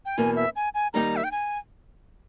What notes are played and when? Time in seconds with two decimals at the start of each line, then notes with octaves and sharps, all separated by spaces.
0.05 G5
0.17 E2 B2 A#3 G#5
0.36 E5
0.56 G#5
0.74 G#5
0.94 D#3 G3 A#3 D#4 G4 A#5
1.16 E5
1.24 G5
1.31 G#5